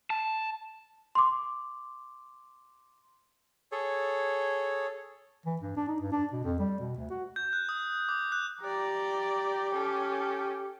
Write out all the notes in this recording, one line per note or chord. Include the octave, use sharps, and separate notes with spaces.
A5
C6 D6
G#4 A4 C#5
E3
G2
D4
D#4
G2
D4
B2
F2
G3
B2
D2
F#4
G6
F#6
D#6
D6
F#6
G4 D5 A#5
C#4 A4